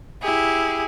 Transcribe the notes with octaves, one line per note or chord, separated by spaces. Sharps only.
E4 G4 G#4